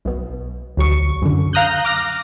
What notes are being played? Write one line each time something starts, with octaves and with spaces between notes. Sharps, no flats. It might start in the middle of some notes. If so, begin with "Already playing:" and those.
B1 B2
D2 F#3 C#6
F#2 D3
F5 A#5 D#6 F#6 G6
D6 F6 A#6